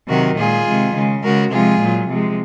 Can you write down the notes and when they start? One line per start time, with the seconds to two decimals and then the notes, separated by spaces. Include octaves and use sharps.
0.08 C3 D#3 F#3 F#4 A#4
0.38 A#2 G#3 F4 G#4
0.67 C3 D#3 G#3
0.95 C#3 G#3
1.23 C#3 G#3 F#4 A#4
1.51 C3 F3 G#3 F4 G#4
1.81 A#2 F#3
2.09 C3 F3 G#3